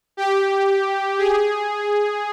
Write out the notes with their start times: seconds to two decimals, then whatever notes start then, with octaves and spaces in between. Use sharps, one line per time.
0.17 G4
1.18 G#4